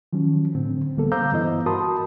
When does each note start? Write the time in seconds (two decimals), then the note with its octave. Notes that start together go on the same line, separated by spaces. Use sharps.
0.13 D#3 F3 F#3 C#4
0.55 A2 D3 C4
0.96 C#2 D3 G3 A#3 B3 A4
1.12 C5 F5 A#5 D6 E6 G6
1.32 G2 E3 B3 E4 D#5
1.66 F#4 A#4 A5 B5 C6 D#6